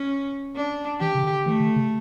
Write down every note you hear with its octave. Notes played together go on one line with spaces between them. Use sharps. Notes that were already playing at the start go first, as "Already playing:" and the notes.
Already playing: C#4
D4
E3 G4
C#3
D3
E3 A3
D3
C#3